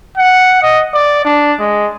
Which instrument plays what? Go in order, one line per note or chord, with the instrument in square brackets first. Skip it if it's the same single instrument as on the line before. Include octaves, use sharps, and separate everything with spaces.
[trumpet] F#5
D#5
D5
D4
G#3